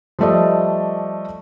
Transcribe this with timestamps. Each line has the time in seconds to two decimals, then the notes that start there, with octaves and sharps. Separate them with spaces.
0.19 F3 G3 A3 D5 D#5